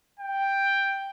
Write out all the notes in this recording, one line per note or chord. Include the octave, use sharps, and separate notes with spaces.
G5